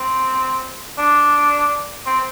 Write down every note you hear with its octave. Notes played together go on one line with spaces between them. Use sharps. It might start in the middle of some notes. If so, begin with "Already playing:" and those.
Already playing: C4
D4
C4